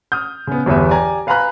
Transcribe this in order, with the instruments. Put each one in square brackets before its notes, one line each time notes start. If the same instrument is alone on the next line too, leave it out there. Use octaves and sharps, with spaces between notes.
[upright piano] D#6 F6 G6
C#3 B3
G1 E2 G3 B3 B4 E5
G4 D5 G#5 A#5
B4 F5 G#5 A#5 B5 F#6